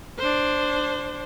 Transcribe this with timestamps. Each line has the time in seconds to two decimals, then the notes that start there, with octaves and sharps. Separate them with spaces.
0.19 D4 C5